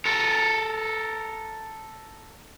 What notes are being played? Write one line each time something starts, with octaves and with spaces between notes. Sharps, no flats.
A4 A#4